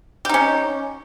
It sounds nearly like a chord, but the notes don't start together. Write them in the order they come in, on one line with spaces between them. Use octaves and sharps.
G4 D#4 C#4